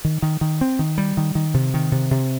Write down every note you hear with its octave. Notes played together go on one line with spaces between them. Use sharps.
D#3
D#3
D#3
C4
D#3
G3
D#3
D#3
C3
D#3
C3
C3